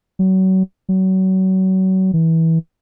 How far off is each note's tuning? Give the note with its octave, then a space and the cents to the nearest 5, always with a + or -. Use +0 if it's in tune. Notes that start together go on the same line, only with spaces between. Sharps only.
F#3 +30
F#3 +30
E3 -20